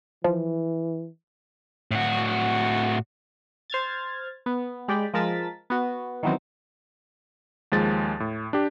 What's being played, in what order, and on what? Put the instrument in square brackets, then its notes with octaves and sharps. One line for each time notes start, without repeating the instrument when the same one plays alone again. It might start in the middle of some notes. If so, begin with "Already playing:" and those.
[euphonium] E3 [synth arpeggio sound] F3
[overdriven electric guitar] A2 F#4
[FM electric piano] C5 F6 G#6 A6
B3
G#3 G4 D5 G5 B5
F3 G#3 A#4 A5 A6 B6
B3 F#4
D#3 E3 F#3 B3 C4
[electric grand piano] D#2 F3 G#3 A6
A2
D4 G4